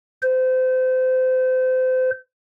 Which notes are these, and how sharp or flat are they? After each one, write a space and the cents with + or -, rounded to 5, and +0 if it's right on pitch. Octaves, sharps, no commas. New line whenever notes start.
C5 -30